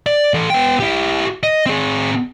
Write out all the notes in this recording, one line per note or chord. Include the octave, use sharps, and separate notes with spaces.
D5
E3 A4
B3 G5
E4 G4
D#5
C4 G#4